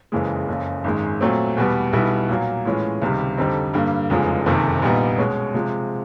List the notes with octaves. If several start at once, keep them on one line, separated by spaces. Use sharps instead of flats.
F#1 F2 C#3 E3 G#3
F#1 F2 C#3
G#1 F#2 D#3 G#3
A#2 F#3 A3 C4
E2 B2 G3 B3
B1 B2 G3 B3 E4
A#2 F#3 A#3
A2 E3 G#3 C#4 F4
C#2 C3 D#3 G3
F2 D3 G3 C4 D#4
G2 D3 G3 A#3
F1 E2 C#3 F3 G#3
F#1 F2 C3 D#3
A#1 A#2 G3 B3 D#4
B2 G#3 C#4
C3 F3 G#3